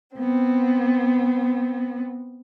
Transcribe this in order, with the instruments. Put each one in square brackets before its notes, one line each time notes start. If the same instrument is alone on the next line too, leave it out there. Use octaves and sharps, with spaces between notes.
[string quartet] B3 C4